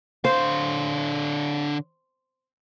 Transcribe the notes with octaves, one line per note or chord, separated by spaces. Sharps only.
D3 C5 F5